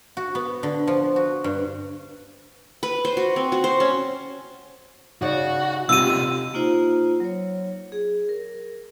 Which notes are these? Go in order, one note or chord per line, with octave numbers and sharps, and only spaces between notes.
F#4
B3
D3
F3
F#4
G2
B4
C5
F#4
C4
F#4
C5
C#4
C#3 D#4 F#4 D5
C3 D#4 F4 G4 E6 D#7
A#3 D#4 F4 C5 A#5
F#3 C#5
G#4
A#4